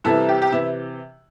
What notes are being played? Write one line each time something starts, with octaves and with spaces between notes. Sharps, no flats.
C2 C3 E3 E4 A4
G4
G4
C3 E3 E4